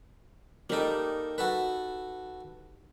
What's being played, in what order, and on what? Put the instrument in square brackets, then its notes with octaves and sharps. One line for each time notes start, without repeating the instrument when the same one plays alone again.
[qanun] G3 D#4 [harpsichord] A#3 A4
[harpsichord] F#4 A4 B4